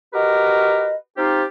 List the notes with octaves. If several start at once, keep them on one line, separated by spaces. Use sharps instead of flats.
F#4 G4 A#4 B4 D#5
C4 D#4 F4 G4